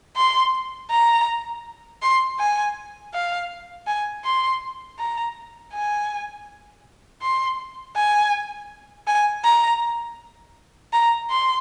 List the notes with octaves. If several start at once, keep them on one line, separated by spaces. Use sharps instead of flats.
C6
A#5
C6
G#5
F5
G#5
C6
A#5
G#5
C6
G#5
G#5
A#5
A#5
C6